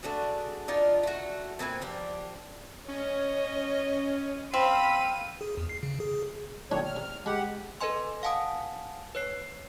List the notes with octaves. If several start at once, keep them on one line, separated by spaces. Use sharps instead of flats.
A3 D4 F#4 G#4
D4 D#4 F4 D5
A3 F#4
A#2 C4 B4 G#5
F3 D4 G4
C#4 C#5 D#5
C4 F5 B5 E6 D#7
G#4
E2
C7
C#3
G#4
B1 A2 D#3 A#3 D4 C#5
F6
C3
G#3 G4 F#5 B5
A4 B4 D#5 G#5 C6
F5 F#5 G#5 A5 D#6
B4 C#5 C7